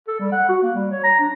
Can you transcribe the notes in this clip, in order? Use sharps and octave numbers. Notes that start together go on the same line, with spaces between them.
A4
G3
F#5
F#4
A#3
G3
C#5
A#5
D4